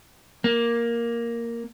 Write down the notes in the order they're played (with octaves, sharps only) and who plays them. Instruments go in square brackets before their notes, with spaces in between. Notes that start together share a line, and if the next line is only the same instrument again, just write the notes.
[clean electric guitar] A#3